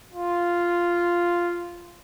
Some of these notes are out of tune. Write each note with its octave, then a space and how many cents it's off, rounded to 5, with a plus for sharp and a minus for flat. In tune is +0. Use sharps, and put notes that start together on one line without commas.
F4 -5